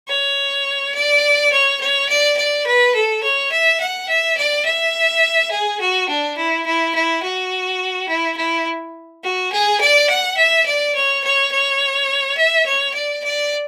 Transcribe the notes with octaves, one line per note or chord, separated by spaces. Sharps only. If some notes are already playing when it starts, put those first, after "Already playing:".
C#5
D5
C#5
C#5
D5
D5
B4
A4
C#5
E5
F#5
E5
D5
E5
G#4
F#4
D4
E4
E4
E4
F#4
E4
E4
F#4
G#4
D5
F#5
E5
D5
C#5
C#5
C#5
E5
C#5
D5
D5